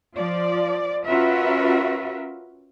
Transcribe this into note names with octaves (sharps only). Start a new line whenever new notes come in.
F3 D5
C#4 F4 F#4 A#4 B4 E5